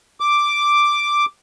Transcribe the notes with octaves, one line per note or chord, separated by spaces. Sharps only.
D6